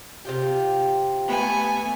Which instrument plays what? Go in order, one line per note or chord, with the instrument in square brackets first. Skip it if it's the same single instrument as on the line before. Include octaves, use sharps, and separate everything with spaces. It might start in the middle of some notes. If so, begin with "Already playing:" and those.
[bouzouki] C3 F4 G4
[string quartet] A3 B3 G#5